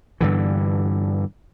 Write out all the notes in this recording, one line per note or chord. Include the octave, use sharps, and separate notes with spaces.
G2 D3 E3